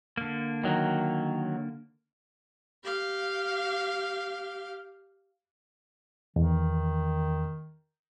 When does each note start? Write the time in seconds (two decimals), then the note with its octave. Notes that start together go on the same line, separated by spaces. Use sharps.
0.17 D3 A#3
0.64 D#3 F#3
2.84 G4 F5
6.36 E2 D#3